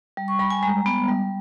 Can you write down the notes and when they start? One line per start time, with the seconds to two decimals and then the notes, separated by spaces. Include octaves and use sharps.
0.17 G3
0.28 C#6
0.39 G3 B5
0.50 G#5
0.63 G#3 A#5
0.86 B3
1.08 G3